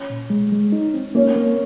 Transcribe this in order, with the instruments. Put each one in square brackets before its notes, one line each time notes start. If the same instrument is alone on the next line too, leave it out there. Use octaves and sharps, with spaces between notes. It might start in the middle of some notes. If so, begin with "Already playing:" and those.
Already playing: [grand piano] C#4
[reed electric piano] A#2
G#3
G#3
D#4
C4
[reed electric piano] A#3 [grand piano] C#4
[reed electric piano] A#3